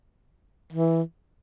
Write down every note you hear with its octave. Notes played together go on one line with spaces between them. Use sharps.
E3